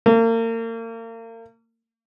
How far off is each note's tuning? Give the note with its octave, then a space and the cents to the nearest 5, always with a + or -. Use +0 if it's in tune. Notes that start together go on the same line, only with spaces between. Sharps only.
A#3 -35